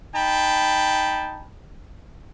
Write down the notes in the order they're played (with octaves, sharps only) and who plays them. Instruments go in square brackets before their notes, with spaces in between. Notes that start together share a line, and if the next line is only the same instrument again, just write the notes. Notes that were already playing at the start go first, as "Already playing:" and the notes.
[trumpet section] D#4 G5 A5 B5